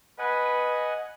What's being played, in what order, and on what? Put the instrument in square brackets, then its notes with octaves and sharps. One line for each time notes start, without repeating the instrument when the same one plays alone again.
[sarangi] B4 [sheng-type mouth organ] D#5 F#5 G#5